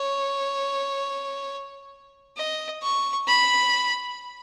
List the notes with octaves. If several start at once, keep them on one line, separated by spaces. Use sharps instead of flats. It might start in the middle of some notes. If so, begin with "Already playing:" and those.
Already playing: C#5
D#5
C#6
B5